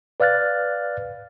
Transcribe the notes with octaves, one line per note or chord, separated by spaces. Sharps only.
B4 D5 F5 F6 F#6 A6